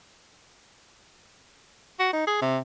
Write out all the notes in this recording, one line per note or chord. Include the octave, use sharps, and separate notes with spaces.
F#4
D#4
G#4
C3